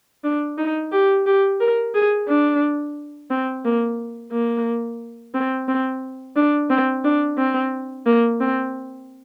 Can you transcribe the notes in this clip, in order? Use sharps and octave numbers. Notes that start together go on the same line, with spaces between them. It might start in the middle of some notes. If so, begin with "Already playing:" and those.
D4
D#4
G4
G4
A#4
G#4
D4
C4
A#3
A#3
C4
C4
D4
C4
D4
C4
A#3
C4